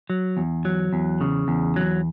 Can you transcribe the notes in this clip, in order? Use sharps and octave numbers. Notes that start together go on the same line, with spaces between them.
F#3
E2
F#3
E2
C#3
E2
F#3